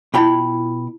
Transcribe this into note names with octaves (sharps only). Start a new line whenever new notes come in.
B2 E4 F4 G5 B5